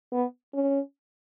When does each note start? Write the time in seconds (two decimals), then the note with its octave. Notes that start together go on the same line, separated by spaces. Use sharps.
0.12 B3
0.54 C#4